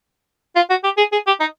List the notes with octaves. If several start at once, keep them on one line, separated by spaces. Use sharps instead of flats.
F4
F#4
G4
G#4
G#4
G4
D#4